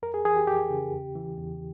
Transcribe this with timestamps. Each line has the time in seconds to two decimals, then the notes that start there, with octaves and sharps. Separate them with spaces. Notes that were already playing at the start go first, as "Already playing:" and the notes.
0.03 F2 A#4
0.14 G#4
0.25 E3 G#4
0.36 G4
0.47 F2 G4
0.70 C#3
0.93 E2
1.15 E3
1.38 E2